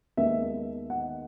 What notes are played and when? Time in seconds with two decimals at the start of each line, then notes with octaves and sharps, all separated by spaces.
0.17 D#2 D#3 G#3 B3 E5
0.90 F#5